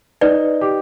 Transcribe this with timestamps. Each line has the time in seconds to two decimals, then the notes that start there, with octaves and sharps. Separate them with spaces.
0.21 D#4 B4 D5
0.61 G4